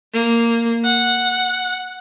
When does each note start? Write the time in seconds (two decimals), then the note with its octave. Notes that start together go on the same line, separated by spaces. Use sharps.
0.13 A#3
0.84 F#5